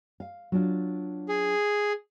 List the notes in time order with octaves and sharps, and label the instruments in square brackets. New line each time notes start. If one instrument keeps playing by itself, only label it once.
[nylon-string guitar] F5
F#3 D4 F4
[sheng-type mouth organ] G#4